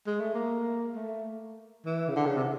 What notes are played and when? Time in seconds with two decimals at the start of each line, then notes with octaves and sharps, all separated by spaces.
0.07 G#3
0.20 A3
0.34 A#3
0.95 A3
1.86 E3
2.09 C#3
2.16 D3
2.26 C#3
2.37 C3